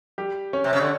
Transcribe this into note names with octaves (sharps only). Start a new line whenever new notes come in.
G3 G4
C#4 C#5
C3
C#3
D3